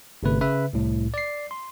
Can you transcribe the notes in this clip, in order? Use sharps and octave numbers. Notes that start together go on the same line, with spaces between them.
G1 C3 A3 B4
C#3 B4 E5
C2 A2
D5 C7
C6